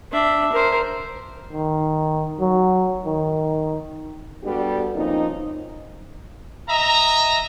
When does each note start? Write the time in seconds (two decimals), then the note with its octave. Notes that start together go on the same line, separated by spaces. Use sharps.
0.12 D4 E5
0.52 A#4 C5
1.52 D#3
2.41 F#3
3.05 D#3
4.44 G3 B3 D4 F#4 G4 A4
4.95 F3 A#3 C4 C#4 D#4
6.69 D#5 E5 A#5